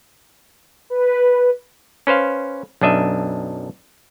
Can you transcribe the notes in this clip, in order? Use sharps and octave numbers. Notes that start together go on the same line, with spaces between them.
B4
C#4 B4 C5 F5
B1 F#2 D4 D#5 E5